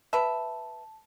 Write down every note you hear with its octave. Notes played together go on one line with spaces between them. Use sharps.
B4 E5 A5